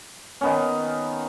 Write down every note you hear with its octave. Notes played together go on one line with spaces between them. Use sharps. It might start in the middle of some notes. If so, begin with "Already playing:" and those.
D#3 B3 C#4